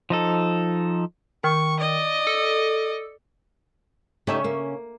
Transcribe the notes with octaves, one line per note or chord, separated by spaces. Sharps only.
F3 D#4 A4
D#3 C#6
D5 D#5
A4
C#3 A3 C#4 D#4 G4 E5
A#3